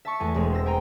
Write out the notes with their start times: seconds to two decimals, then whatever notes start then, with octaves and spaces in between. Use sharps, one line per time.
0.05 E5 A5 C#6
0.20 E2 A3 G#5
0.34 E1 G#3 C4
0.53 C5 E6 A#6
0.66 G5 G#5 A#5